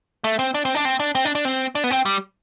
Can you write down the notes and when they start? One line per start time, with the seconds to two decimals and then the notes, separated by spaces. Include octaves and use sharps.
0.24 A3
0.39 C4
0.54 D4
0.65 C4
0.75 D4
0.85 C4
1.00 D4
1.15 C4
1.25 D4
1.35 D4
1.45 C4
1.75 D4
1.84 B3
1.91 C4
2.05 G3